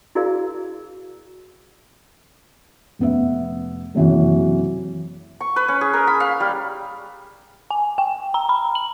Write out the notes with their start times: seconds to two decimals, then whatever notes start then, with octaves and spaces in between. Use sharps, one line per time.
0.15 E4 F#4 G#4 A#4 D5 F5
2.99 F1 B3 E5
3.95 F#1 C3 E3 F#3 F#4
5.41 C#6
5.56 B4
5.68 C#4
5.81 G#4
5.93 A#4
6.07 B5
6.20 F5
6.40 G3
7.71 G#5
7.98 G5
8.34 A#5
8.49 B5
8.75 F#7